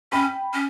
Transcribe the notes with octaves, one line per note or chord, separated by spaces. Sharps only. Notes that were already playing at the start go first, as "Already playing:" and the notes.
C#4 G5 B5
C#4